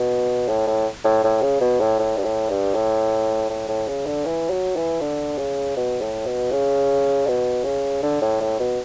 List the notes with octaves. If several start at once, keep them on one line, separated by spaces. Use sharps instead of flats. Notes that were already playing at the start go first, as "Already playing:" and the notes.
Already playing: B2
A2
A2
A2
A2
C#3
B2
A2
A2
G2
A2
G2
A2
A2
A2
C#3
D3
E3
F#3
E3
D3
C#3
B2
A2
B2
C#3
B2
C#3
D3
A2
A2
B2